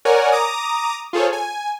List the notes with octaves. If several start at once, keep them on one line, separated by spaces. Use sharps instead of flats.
A#4 C#5 D5 F#5 G#5
A#5 D6 D#6
F4 G#4 A4 C5 C#5
G#5